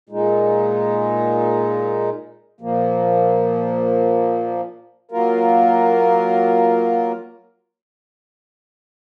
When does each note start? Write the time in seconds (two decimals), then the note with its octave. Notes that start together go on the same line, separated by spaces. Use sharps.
0.09 A#2 G#3 D#4
2.60 A#2 F3 A#3
5.11 F#3 A#3 F4 A#4